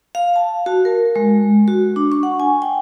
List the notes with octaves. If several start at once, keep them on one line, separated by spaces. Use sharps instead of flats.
F5
A5
F#4
A#4
G#3
F#4
D4
C#6
F#5
G#5
G5